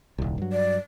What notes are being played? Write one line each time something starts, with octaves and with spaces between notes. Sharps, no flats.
D#1 C2
G2 F#3
D5